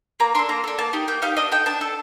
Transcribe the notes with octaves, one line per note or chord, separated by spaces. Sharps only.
A#3 A#5
D4 A4 C6
A#3 A#5
D4 A4
A#3 A5
D#4 G4
A#3 G5
D#4 G4 F5
D4 D#5
A4 G5
D4 A5
A4